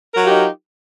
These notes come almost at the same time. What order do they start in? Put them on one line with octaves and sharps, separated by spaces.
A#4 F#3 F4 G4 D#4